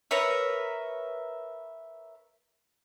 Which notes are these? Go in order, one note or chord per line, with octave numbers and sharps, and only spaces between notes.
A#4 B4 C#5 E5